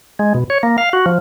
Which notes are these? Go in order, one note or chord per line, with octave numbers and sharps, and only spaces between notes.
G#3
B2
C#5
A#3
F5
F#4
F3